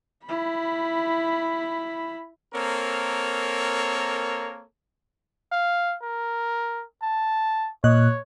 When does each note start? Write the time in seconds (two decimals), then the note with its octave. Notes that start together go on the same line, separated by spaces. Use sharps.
0.24 E4 B5
2.54 A#3 C4 A4 A#4 C#5
5.52 F5
6.02 A#4
7.02 A5
7.84 A#2 C#5 D#5 F#6